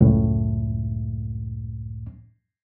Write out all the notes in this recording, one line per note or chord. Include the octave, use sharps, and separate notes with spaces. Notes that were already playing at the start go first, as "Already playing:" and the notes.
C#2 F#2 A2